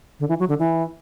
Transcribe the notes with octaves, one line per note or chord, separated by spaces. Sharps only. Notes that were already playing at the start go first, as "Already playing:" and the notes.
D3
E3
F#3
D3
E3